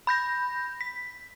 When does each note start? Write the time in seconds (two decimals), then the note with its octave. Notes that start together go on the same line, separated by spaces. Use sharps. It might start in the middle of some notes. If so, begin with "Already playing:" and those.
0.07 B5 G6 A#6
0.81 B6